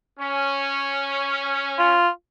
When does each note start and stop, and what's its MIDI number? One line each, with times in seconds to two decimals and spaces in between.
0.19 2.04 61
1.79 2.09 65